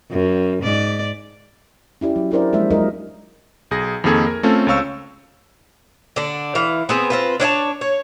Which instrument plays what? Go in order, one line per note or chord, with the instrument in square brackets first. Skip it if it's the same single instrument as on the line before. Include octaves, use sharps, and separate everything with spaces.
[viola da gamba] F#2
G#2 D5
[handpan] C#4 E4 G4 D5
F#3
D4 E4 G#4 A#4 C5 D5
F3 G#3 A#3 C5 E5
F#3 G#3 D#4 F4 A#4 D#5
[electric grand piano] B1 G#4 A#6
F2 D#3 A#3 G#4 A4 G#6
A#4
A3 C4 C#4 F4 A4
C#2 C4 C#5 F5 C#6 E6
[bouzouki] D3 D4
E3 F5
B3 C4 G#4
C4 F4 B4
D4 C#5 D#5 A5
C#5